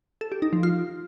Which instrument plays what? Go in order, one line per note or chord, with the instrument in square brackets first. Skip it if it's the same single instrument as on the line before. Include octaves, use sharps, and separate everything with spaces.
[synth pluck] A4
G4
D#4
F3
F4